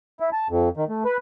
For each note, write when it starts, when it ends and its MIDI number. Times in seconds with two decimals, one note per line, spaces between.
0.20 0.30 64
0.33 0.47 81
0.50 0.69 41
0.77 0.85 51
0.89 1.04 57
1.05 1.17 71